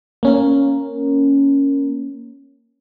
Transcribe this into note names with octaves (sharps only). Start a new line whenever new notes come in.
A#3 C#4 A#4